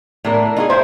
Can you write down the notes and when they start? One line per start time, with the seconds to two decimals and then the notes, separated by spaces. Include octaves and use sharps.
0.25 A2 D4 A#4
0.57 D#4 F4 G#4
0.70 E4 C5